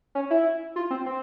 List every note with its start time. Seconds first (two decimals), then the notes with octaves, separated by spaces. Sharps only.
0.15 C#4
0.30 E4
0.76 F4
0.90 C4
1.06 C4